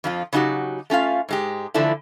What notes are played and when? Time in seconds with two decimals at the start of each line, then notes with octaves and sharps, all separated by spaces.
0.04 F2 F3 F4
0.33 C#3 F#3 D#4 F#4 G4
0.90 A3 C#4 F4 F5
1.29 G#2 G#3 G4
1.74 D3 E3 F3 A3 D4 E4